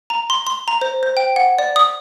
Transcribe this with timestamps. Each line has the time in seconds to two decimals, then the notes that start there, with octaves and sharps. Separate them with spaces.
0.10 A#5
0.30 C6
0.47 C6
0.68 A#5
0.81 C5
1.03 C5
1.17 G5
1.36 F#5
1.58 D5
1.76 D#6